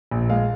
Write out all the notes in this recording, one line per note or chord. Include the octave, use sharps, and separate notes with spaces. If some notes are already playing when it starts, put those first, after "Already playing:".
A#1
G#3 F5